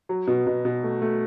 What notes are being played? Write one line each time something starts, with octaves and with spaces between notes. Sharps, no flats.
F#3
B2
B2
B2
A3
A3